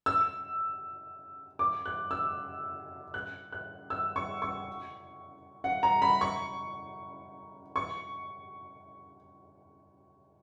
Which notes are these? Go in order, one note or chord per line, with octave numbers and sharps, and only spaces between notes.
E6
D6
F#6
E6
F#6
F#6
E6
C#6
C#6
F#5
A#5
B5
C#6
C#6